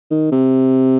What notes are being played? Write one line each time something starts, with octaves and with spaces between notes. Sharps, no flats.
D#3
C3